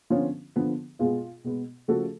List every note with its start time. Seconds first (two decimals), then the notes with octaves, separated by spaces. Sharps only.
0.10 D3 F3 B3 C#4 F4
0.56 D3 F3 B3
0.99 B2 G#3 B3 F4 G#4
1.44 B2 G#3 B3
1.88 C#3 F3 A3 F#4 A4